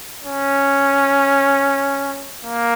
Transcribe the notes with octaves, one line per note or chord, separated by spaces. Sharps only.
C#4
A#3